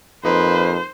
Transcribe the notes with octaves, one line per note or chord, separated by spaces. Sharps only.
F2 A#3 D#4 B4 C5